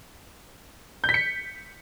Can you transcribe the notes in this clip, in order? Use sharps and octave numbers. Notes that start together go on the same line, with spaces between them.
G6
B6
C#7